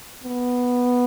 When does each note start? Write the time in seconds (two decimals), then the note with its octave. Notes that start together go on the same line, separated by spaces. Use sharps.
0.24 B3